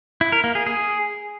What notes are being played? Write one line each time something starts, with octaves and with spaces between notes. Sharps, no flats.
E4
A#4
A#3
G#4
G#4